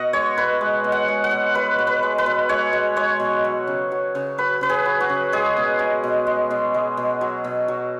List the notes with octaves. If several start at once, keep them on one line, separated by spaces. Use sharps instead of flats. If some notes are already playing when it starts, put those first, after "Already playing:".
Already playing: B2 D#5 F#5
G#3 C#5
B2 B4
G#3
B2
F#5
G#3
F#5
B2
G#3 B4
B2
B4
G#3
B4
B2
G#3 C#5
B2
G#3 C#5
B2
F#3
C#3
F#3
C#3
F#3 B4
C#3 B4
G#4
F#3
F#4
C#3
G#3 G#4
B2
G#3
B2
G#3
B2
G#3
B2
F#3
B2
F#3